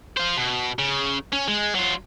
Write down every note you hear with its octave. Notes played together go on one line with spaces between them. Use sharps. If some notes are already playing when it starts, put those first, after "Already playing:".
F4 C5
B2
C#3
C#4
G#3
F#3 F4